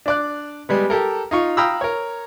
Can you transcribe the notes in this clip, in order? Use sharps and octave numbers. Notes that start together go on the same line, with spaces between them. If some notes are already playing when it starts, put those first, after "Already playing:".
D4 D5 F#6
G3 G#3 B3
G4 A4 A#4
D#4 F4 C#6
F5 G5 A#5 B5 D#6 E6
A#4 C#5